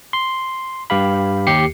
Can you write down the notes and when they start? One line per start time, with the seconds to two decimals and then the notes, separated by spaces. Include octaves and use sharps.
0.13 C6
0.90 G2 G4 F5 B5
1.47 D#2 G4 C7 C#7